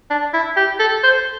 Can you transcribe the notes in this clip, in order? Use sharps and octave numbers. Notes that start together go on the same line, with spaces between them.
D4
E4
G4
A4
C5